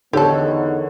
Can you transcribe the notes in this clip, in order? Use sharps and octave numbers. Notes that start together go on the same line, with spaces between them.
E2 D3 D#3 B3 D#4 G4 A4 C#5